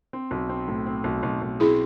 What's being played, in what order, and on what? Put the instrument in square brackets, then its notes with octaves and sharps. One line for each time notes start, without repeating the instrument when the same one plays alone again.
[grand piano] C4
B1
C4
A2
C4
B1
B1
B1
[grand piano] C4 [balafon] E4 G#4